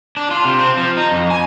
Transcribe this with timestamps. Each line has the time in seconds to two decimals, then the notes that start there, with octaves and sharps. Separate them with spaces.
0.17 D4
0.31 F4
0.45 C3
0.59 C4
0.77 F3
0.97 D#4
1.11 F2
1.31 G#5